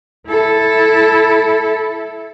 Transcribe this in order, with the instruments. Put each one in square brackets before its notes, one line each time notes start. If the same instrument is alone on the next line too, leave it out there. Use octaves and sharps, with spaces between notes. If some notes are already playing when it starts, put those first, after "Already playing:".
[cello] E4 A4